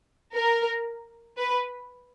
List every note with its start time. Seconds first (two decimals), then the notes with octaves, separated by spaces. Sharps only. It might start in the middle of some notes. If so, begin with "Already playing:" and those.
0.34 A#4
1.38 B4